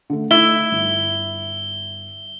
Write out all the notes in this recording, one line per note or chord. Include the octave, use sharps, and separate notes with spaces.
D3 A3
A3 D#4 E4 G7
G1